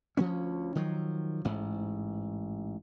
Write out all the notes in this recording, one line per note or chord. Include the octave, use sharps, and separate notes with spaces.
D2 F3 B3 C#4
D#3 F3 F#3
A1 G#2